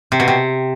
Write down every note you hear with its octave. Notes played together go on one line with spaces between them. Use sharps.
C3
B2
C3